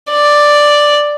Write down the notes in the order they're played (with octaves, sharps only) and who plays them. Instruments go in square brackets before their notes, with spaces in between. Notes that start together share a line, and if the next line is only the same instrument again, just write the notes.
[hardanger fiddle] D5